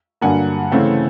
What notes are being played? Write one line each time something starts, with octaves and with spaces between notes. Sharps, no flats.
G2 D3 F#3 A#3 F#5 G#5
C#3 E3 A3 C4